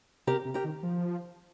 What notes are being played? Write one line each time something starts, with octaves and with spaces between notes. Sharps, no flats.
C3 G4 A#4
C3
G4 A#4
D#3
F3